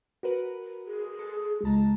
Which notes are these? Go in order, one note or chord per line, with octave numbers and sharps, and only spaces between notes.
F#4 A#4 B4
G#4
A4
C#2 G#3 A5 A#5